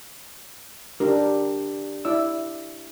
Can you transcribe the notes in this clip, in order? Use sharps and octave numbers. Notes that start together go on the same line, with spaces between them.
D4 G4 A#4
E4 D5 E6